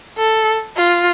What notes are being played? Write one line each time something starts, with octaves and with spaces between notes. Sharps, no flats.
A4
F4